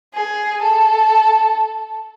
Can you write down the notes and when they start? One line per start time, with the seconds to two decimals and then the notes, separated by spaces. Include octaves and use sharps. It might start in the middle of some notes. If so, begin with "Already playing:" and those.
0.14 G#4
0.62 A4